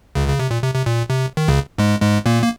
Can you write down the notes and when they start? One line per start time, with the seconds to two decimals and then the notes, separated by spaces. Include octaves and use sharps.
0.15 C#2 C#3
0.28 C#3
0.39 C3
0.51 A#2
0.63 C3
0.74 C3
0.86 A#2
1.10 C3
1.37 D#3
1.48 C#2 C#3
1.78 G#2 G#3
2.02 G#2 G#3
2.26 A#2 A#3
2.42 A#3